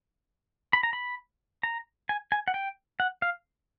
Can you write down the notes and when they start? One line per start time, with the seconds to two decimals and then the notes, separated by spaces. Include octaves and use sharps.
0.73 B5
0.83 A#5
0.93 B5
1.63 A#5
2.09 G#5
2.32 G#5
2.48 F#5
2.54 G5
3.00 F#5
3.22 F5